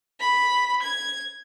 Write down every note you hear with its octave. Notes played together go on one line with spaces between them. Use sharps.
B5
G#6